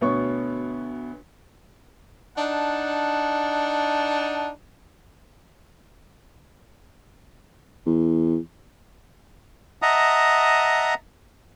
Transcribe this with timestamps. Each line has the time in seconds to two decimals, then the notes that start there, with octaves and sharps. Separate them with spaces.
0.01 D2 B2 B3 C#5 C#6
2.37 D4 D#4 F#5 A5
7.86 E2
9.82 D#5 E5 F#5 A5 A#5 D#6